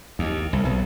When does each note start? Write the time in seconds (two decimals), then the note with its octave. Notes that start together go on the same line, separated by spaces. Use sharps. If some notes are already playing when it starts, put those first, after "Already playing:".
0.19 D#2
0.53 C2
0.65 B1